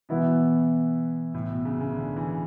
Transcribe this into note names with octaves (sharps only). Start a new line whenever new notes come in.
B2 E3 B3 E4
A2
B2
C#3
C#3
D3
E3